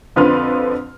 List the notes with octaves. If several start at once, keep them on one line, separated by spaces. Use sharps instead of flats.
F2 D3 F3 B4 C6 F6